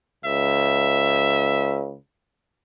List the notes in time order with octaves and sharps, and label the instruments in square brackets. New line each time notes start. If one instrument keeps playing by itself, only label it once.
[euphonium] C#2 [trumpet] E5